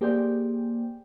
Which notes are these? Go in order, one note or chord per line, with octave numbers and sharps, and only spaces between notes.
A#3 G4 G#4 C5 D5 G5